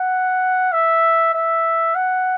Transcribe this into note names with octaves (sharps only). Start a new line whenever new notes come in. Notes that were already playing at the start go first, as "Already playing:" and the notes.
Already playing: F#5
E5
E5
F#5